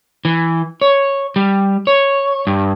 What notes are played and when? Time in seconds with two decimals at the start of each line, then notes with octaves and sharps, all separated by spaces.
0.25 E3
0.81 C#5
1.36 G3
1.87 C#5
2.47 G2